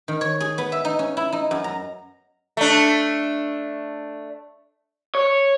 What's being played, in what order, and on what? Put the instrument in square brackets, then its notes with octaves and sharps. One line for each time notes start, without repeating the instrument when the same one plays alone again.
[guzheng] D#3
C#5
G#4
B3
E5
D#4
C#4
E4
D#4
F#2
A#5
[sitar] A3 D4
[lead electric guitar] C#5